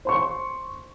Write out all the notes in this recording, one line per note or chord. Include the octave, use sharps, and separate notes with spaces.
C5 C6 C#6